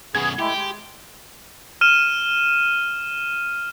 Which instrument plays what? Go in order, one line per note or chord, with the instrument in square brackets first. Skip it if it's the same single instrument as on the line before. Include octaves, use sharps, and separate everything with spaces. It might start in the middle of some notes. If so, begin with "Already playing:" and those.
[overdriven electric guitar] F#2 B2 [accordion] B3 G#4 [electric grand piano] G#6
[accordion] G#3 A3 E4 [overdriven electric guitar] G4
[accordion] G#3
[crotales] F6 D#7 E7